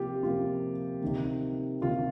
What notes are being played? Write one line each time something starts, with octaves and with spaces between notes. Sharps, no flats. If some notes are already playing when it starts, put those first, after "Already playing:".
Already playing: C3 F3 A#3 F4 G4
C3 F3 A#3 F4
C3 D#3 A#3
C3 D#3 A#3 F4